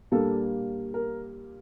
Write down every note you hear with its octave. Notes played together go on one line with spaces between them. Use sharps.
A#2 G3 A#3 D4 A4
A#4